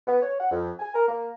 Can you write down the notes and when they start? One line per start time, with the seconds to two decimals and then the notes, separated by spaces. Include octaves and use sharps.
0.08 B3
0.23 C#5
0.40 F#5
0.52 F2
0.79 G#5
0.94 A#4
1.08 A#3